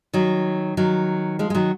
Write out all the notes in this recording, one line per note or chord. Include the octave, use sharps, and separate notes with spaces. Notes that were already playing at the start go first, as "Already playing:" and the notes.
D#3 F#3
D#3 F#3
F3 G#3
G#3
D#3 F#3